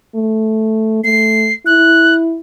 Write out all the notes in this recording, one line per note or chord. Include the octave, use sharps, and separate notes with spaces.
A3
A3 C7
E4 F#6